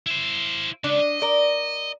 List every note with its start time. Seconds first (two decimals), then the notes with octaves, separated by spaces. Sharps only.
0.06 E4 C5
0.84 C#3 G#3 D4
1.00 D#5
1.22 A#4 D5